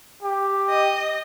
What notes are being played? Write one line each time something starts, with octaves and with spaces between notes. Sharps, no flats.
G4
D#5